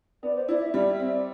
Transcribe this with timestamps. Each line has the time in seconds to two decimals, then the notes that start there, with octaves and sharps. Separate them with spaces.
0.23 B3 D5
0.36 C5
0.48 E4 D5
0.61 E5
0.74 G3 D5
0.90 E5
1.00 C4
1.08 D5